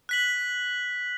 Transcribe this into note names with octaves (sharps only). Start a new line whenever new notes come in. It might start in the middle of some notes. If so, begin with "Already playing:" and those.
F#6 B6 F#7